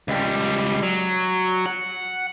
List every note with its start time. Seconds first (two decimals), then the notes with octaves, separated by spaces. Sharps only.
0.08 C#2 G3
0.83 F#3
1.66 F#5